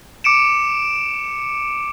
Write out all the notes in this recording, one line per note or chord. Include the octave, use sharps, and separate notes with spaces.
D6 C#7 D7 E7